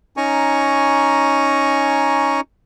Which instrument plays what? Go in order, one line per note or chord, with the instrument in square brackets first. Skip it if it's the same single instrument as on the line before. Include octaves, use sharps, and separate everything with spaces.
[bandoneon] C#4 D#4 G#5 A#5 C#6